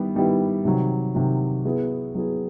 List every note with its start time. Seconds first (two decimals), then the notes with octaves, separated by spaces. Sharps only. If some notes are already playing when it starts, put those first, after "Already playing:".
Already playing: D#3 G3 B3 E4 G4
0.15 D#3 G3 B3 E4 G4
0.65 C3 D#3 F#3
1.15 C3 D#3 F#3
1.65 F#3 B3 E4 G#4
2.15 F#3 B3 E4 G#4